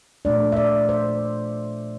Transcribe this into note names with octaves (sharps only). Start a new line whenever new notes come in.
A#2 F3 A3 D4 D5
E5
D5
C5